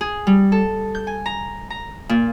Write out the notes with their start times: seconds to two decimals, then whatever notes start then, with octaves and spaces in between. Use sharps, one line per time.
0.01 G#4
0.27 G3
0.52 A4
0.95 G6
1.07 G#5
1.26 A#5
1.70 A#5
2.09 A#2